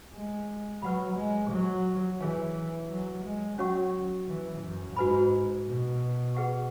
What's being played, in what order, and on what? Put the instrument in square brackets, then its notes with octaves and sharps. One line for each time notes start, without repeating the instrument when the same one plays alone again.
[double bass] G#3
[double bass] F#3 [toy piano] B4 F#5 B5
[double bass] G#3
F#3
[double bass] E3 [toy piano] G#4 C#5 G#5
[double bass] F#3
G#3
[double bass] F#3 [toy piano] C#4 F#4 C#5 F#5 C#6
[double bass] E3
F#2
[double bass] G#2 [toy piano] F#4 B4 G#5 B5
[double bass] B2
[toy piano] G#4 B4 F#5 C#6